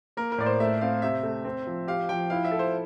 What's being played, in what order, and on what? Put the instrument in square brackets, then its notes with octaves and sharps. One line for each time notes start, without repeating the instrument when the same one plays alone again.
[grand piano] A#3 [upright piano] A#4
[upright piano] A#4
[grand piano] A2 [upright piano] D5
[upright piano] C5
[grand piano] A3 [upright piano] E5
[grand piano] C4 [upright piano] F5
[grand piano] C3 [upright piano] E5
[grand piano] A3
C4
F3
[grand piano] G4 [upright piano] F5
[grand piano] F3 [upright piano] G5
[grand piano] E4 [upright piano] F5
[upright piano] E5
[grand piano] A4
[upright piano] C5